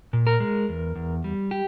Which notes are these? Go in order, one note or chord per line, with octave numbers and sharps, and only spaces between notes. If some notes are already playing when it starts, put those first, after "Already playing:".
A#2
A#4
G#3
E2
E2
G3
G4